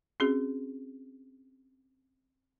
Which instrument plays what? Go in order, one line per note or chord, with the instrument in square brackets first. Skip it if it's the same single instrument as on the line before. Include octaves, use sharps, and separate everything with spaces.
[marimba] C4 C#4 F#4 G#4